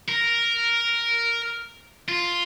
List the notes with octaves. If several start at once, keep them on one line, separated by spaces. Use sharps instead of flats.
A#4
F4